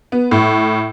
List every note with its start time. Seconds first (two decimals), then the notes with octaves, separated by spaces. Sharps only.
0.12 B3
0.31 A2